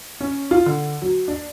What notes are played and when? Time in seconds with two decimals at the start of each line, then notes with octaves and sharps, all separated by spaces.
0.21 C#4
0.51 F4
0.66 D3
1.02 F#3
1.28 D4